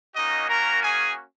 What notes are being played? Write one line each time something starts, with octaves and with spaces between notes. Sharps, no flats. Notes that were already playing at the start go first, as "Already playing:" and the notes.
A#3 C#4 D#4 F#4 D#5
A#4 A#5
G#4 G#5